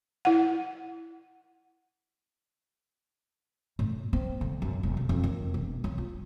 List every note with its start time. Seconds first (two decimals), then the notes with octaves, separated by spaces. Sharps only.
0.25 E4 F#5
3.79 A2
4.13 C4
4.41 D3
4.62 F#2
4.83 E1
4.97 D3
5.09 F2
5.24 D#3
5.54 E1
5.84 F#3
5.98 F4